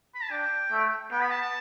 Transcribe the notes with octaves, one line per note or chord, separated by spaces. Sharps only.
B5
A5
D4 G5
A3
B3 G5
B5
A5
A5